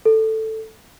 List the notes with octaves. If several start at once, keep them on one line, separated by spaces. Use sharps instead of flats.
A4